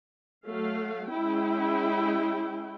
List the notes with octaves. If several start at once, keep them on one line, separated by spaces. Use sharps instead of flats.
F#3 A3 F5
G#3 C#4 E4 G5